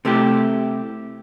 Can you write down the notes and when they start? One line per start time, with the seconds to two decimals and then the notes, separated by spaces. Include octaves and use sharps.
0.05 C3 A3 E4 G4